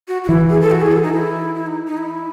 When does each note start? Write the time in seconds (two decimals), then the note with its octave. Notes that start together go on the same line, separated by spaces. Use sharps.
0.08 F#4
0.24 F#4
0.29 E3 E4
0.50 G#4
0.61 A4
0.71 F#4
0.81 G#4
0.92 A4
1.03 D#4
1.14 E4
1.55 E4
1.67 D#4
1.87 D#4
1.98 E4